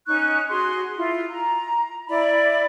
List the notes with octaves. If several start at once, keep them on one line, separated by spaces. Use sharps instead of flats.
C#4 D#4 C#6 F#6
F#4 G#4 C6
E4 F4
A#5
E4 D5 B5